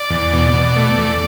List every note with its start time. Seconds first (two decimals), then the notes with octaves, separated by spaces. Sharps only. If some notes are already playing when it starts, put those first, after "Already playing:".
Already playing: D5
0.10 E2
0.33 B2
0.54 B2
0.76 A3
0.97 E2